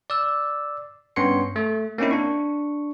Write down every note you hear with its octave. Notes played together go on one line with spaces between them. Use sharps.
D5 E6
G2 B3 C#4 C#5 C6 C#7
A3
A#3 C4 C#4 D#4 E4
D4 C#6